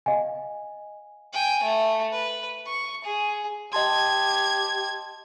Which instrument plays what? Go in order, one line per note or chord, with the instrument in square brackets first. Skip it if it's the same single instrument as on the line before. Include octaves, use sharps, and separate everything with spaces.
[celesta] D#5 F5 G#5
[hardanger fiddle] G5 G#5
A3
B4
C#6
G#4
[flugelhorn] G4 [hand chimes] D#5 A5 C6 [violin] G#6